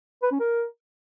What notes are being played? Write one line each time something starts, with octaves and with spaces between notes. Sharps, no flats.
B4
C#4
A#4